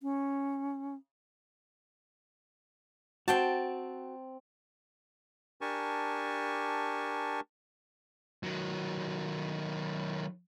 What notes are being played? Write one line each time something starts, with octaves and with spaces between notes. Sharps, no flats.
C#4
C4 F#4 G5 A5
D4 G4 A#4 G#5 A5 C#6
D#3 F#3